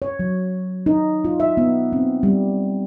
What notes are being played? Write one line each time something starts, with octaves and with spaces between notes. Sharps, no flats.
C#5
F#3
D#4
F4
E5
B3
C4
G3